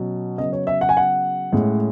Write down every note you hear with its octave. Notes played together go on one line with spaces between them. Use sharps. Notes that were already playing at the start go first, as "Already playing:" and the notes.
Already playing: B2 F#3 C#4
C#3 F#3 B3 D#5
C#5
E5
F#5
G#5
F#5
A2 G#3 C#4